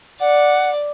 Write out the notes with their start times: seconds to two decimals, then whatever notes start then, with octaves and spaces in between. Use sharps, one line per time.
0.20 D5 F#5